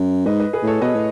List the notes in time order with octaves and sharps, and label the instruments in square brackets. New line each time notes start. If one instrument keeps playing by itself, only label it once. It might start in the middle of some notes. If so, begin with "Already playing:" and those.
Already playing: [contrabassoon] F#2
[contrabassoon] G#2 [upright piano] B4 D#5
[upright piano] B4 D#5
G#4 B4
[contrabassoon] A2 [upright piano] A4 C#5
[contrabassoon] B2 [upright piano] B4 D#5
[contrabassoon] A2